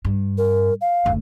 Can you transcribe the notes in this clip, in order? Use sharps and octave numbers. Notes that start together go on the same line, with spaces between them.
G2
A#4
F5
F#1 D2